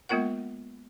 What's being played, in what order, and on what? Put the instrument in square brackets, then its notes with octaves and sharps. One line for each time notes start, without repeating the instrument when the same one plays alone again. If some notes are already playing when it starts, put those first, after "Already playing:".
[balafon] G#3 A#3 B3 F4 A#4 F#5